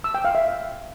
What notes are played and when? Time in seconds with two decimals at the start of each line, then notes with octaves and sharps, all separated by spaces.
0.04 E6
0.14 G5
0.25 F5
0.35 E5